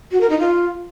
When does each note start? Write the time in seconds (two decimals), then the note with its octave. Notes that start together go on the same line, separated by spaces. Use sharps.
0.12 F#4
0.21 A#4
0.30 D#4
0.39 F4